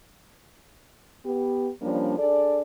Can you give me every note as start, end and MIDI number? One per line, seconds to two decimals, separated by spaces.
1.25 1.69 59
1.25 1.69 67
1.82 2.15 53
1.82 2.15 55
1.82 2.15 58
1.82 2.15 61
1.82 2.15 62
2.19 2.62 62
2.19 2.62 68
2.19 2.62 69
2.19 2.62 74